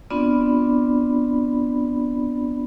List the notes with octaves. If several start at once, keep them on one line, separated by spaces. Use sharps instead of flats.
B3 C4 D4 F4 D5 B5